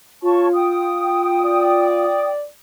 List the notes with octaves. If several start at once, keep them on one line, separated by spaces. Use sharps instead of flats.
F4 C#5 A5 C#6
G5 D#6
D5